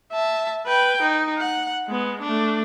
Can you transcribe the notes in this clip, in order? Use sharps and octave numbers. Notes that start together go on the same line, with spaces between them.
E5 A5
B4 G5
D#4
F#5
G#3 B3
A3 D4